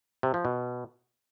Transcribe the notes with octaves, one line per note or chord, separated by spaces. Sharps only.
C3
F3
B2